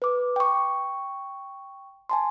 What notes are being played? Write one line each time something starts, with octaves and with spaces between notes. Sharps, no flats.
B4 D6
G5 C#6
G#5 A5 C6